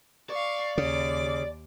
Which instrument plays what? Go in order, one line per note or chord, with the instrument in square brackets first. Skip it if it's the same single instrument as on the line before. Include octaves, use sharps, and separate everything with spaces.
[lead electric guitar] D5 [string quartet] F5 C#6
[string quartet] D#2 D6 [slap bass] C#3